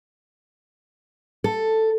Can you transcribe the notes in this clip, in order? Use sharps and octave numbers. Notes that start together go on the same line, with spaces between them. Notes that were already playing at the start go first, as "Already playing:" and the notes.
A4